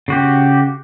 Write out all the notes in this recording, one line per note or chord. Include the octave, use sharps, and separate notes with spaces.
C#3 F#4 G4